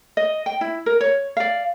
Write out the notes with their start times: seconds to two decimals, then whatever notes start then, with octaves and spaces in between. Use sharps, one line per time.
0.17 D#5
0.46 G5
0.61 E4
0.86 A#4
1.01 C#5
1.37 D5 F5